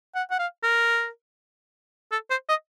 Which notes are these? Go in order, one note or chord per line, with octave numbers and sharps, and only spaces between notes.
F#5
F#5
F5
A#4
A4
C5
D#5